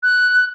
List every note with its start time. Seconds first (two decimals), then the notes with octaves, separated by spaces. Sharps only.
0.03 F#6